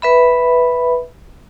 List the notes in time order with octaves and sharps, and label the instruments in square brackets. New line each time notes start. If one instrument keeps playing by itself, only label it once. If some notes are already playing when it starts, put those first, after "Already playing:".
[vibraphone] B4 E5 B5